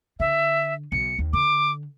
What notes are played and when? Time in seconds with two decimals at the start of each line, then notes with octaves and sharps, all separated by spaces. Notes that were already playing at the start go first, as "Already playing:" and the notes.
0.20 D3 E5
0.92 B1 C#7
1.19 D#2
1.33 D3 D6